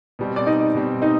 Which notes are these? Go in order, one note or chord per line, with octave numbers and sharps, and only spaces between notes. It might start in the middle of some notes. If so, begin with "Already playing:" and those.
B2 G3 C4
D5
D#4 D#5
B2 G3 C4
D#4 D#5